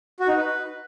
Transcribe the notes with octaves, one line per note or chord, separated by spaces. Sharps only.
F#4
D#4
B4